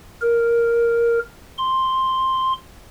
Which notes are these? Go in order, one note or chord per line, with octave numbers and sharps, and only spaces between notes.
A#4
C6